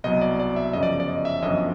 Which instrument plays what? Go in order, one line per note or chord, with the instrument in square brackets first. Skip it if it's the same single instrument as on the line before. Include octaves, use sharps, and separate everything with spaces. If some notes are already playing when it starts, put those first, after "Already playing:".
[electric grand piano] C2 B2 F#3 D#5
D5
D5
E5
G1 F#2 C#3 F3 D#5
D5
D5
D#5
E5
G1 F#2 D3 F3 D#5